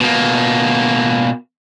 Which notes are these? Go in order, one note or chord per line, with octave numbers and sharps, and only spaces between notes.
B2 A#3